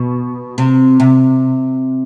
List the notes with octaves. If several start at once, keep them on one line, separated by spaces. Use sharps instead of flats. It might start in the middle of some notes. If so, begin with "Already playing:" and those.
Already playing: B2
C3
C3